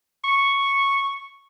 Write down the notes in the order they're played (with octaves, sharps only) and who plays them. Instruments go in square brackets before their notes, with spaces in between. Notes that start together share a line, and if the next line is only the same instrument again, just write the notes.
[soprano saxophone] C#6